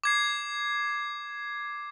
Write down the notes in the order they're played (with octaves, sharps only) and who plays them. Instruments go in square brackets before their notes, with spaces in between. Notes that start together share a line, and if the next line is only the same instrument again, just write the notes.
[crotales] D6 G#6 C7